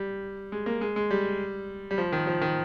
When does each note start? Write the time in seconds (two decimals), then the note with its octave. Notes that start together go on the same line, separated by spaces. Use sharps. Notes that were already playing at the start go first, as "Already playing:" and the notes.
Already playing: G3
0.52 G#3
0.66 A#3
0.81 G#3
0.96 G#3
1.11 G3
1.91 G3
1.98 F3
2.12 D#3
2.27 F3
2.42 D#3